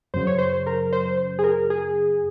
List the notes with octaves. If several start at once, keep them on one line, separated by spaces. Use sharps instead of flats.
F#2 C#3 F#3 C5
C#5
C5
A#4
C5
C5
G#4
A#4
G#4